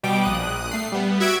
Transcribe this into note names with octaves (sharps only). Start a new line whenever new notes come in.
B2 G3 G5 D6
A#1 D#6 F#6
A3 C7
G3 B3
F#4 E5 G#6 D7